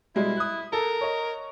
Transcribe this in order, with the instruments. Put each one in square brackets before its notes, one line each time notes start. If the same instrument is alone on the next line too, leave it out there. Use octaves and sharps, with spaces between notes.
[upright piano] B2 G3 G#3 [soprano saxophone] E4
[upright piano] D#6 F#6
[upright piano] A4 [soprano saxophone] A#4
[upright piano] C#5 D#5